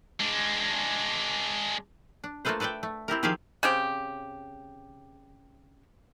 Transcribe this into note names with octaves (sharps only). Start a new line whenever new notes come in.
G#3 D4
D4
A3 A#3 F4 A4 B4 C5
A4 B4 D5 E5 G5
A3
C4 E4 G4 A#4
D#3 F3 G4 G#4 E5 F5
C#3 C4 G4